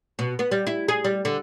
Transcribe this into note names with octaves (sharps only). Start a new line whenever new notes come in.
B2
B3
G3
E4
G#4
G3
D3